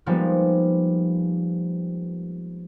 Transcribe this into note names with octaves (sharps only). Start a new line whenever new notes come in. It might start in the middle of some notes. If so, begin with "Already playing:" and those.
F3 G3 G#3 A#3 B3 D#4